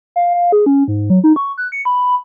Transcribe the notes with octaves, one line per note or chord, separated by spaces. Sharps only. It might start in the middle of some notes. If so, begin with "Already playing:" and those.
F5
F5
G#4
C#4
G#2
F#3
D#4
C#6
F#6
C#7
B5